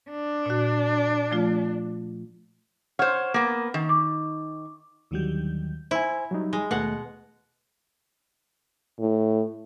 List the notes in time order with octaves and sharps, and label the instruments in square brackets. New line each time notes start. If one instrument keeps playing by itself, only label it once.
[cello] D4
[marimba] A#2 F#4
F3 A3 F4
[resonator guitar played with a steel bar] C5 C#5 [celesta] F#5 F6
[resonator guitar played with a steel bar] A#3 B3
D#3
[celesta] D6
[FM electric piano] D#2 D3 D#3 F#3 G3 G6
[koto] E4 [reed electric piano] C5 G#5
[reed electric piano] F#3 G3 D#4
[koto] G#3
[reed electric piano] D#2 A3 [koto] B2 F#5
[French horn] A2